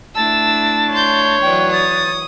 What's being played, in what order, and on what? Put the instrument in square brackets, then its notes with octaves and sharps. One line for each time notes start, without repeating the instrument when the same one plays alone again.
[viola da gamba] A3 D4 E4 [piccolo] A5 [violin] E6
[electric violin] C#5 [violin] C6 G6
[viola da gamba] E3 F#3 [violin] D5 G5
[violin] D#6 [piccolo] A6